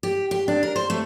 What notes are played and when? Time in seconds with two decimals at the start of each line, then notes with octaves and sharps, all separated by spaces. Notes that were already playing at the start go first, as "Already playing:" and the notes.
0.03 G4
0.31 G4
0.48 D4
0.63 A#4
0.76 C5
0.90 A3